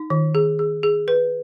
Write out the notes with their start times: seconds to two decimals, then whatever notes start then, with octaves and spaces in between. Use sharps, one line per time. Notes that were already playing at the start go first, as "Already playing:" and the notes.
Already playing: D#4
0.10 D#3
0.35 G#4
0.59 G#4
0.83 G#4
1.08 B4